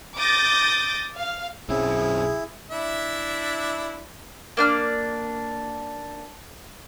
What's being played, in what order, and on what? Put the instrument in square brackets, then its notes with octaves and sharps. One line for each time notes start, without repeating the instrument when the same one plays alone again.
[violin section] D6 D#6 G6 A6 A#6
F5
[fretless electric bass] B1 C#4 [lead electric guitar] F#2 C4 [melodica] E4 [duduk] G#4
[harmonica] D4 E4 E5
[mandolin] A#3 D4 F6